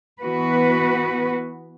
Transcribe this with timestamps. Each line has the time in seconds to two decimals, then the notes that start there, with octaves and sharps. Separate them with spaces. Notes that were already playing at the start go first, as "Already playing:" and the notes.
0.21 E3 B3 F#4 B4